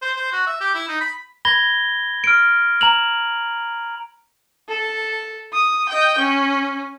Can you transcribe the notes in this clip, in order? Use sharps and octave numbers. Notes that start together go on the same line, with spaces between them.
C5
C5
F#4
E5
G4
E4
D#4
B5
B5 G#6 A#6 G7
F6 D7
A#5 F7 F#7
A4
D#6
D#5 G5
C#4